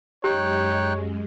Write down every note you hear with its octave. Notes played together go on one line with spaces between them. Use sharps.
F#2 G#3 D#4 G4 C#5 G5 F#6